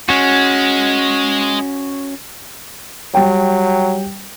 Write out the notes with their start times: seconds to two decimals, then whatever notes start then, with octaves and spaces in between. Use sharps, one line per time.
0.09 G#3 C#4 F#4
3.15 F#3 G3 G5